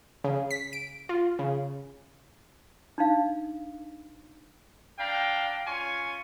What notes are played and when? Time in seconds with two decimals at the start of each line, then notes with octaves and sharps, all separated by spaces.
0.24 C#3
0.51 B6
0.73 D7
1.09 F4
1.39 C#3
2.98 D4 D#4 F5
4.99 D4 F5 G5 A#5
5.67 C#4 F4 G#5 C#6